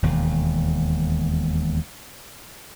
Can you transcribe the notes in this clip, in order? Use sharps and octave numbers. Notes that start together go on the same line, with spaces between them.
E1 D#2